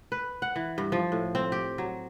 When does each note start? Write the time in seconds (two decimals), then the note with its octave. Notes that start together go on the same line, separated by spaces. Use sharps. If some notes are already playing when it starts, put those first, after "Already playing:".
0.12 B4
0.42 F#5
0.56 E3
0.78 G2
0.92 F3
1.12 A2
1.35 C4
1.52 G4
1.78 F#3